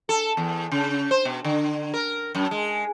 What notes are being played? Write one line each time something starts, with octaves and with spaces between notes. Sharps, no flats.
A4
E2
C#3
C5
B2
D3
A#4
F#2
G#3